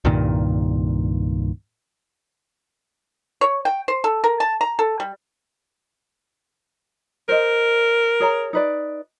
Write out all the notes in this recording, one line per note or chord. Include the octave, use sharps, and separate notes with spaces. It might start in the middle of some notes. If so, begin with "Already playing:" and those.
C2 G2 A#2 D#3
C#5
G5
C5
A4
A#4
A5
A#5
A4
G3
A#4 C5 D#5
G#4 C#5 A#5
D#4 B4 D5